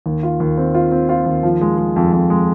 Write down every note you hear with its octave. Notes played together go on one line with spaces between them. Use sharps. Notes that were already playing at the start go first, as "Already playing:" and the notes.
D#2
F4
D#2
C4
F4
C4
F4
D#2
F3
G#3
G#3
F2
F2
G#3